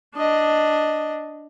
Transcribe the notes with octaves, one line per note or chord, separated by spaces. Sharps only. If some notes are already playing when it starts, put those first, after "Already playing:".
D4 D#5